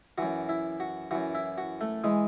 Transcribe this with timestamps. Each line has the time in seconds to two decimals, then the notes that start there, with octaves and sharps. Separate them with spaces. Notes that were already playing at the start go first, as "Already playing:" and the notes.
0.18 F#2 E3 F#4
0.49 E4
0.80 F#4
1.11 F#2 E3 F#4
1.35 E4
1.58 F#4
1.81 A3
2.04 E3 G#3